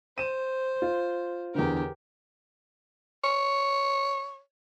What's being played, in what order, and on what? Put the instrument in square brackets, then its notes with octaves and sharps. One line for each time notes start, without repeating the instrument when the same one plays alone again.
[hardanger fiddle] C5 [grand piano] D#7 E7
[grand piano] F4
[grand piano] E2 D3 [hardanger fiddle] G4 A#4
[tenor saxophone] C#5